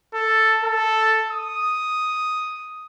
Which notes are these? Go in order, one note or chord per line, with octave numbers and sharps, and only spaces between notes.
A4
A4
D#6